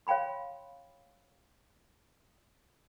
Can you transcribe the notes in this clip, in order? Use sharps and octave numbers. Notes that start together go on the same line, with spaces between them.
C#5 F5 G5 B5 C6